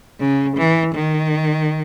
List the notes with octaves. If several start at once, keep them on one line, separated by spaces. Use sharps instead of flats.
C#3
E3
D#3